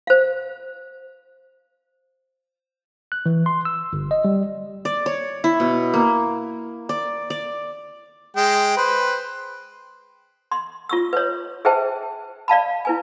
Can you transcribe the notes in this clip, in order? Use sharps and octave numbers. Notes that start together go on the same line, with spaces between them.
C5 F5
F#6
E3
C6
E6
G1
D#5
G3
D5
C#5
E4
B2
A#3
D5
D5
G#3 G5
B4 C5
C6
F4 C#6 E6
B4 C#5
G#4 B4 C5 E5 G5 A5
D5 F5 A5 B5
E4 B4 G#5